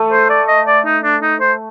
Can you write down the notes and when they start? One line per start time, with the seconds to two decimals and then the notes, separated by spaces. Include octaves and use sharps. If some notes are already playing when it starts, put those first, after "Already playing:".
Already playing: A3
0.12 C5
0.30 D5
0.48 D#5
0.67 D5
0.86 D#4
1.04 D4
1.22 D#4
1.40 C5